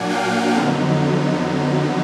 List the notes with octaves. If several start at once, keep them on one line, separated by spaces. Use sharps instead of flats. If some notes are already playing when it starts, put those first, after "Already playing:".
Already playing: A#2 F#3 A#3 D4 F#5 G#5
F5 G5
F2 D3 F#3 B3 D#4